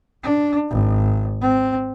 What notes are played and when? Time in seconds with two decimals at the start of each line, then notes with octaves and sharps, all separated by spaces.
0.24 D4
0.71 G#1
1.41 C4